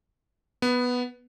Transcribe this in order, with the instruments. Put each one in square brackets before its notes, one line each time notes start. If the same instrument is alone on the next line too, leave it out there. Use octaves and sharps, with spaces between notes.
[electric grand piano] B3